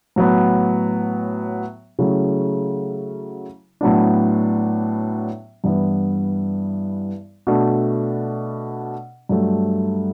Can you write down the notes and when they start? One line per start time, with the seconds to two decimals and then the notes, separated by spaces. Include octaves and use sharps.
0.16 A2 F#3 B3
1.99 C#3 F#3 A3 C#4 E4
3.81 A2 F#3 B3 D4
5.64 G2 E3 B3 E4
7.47 B2 A3 D4
9.29 G2 F#3 A3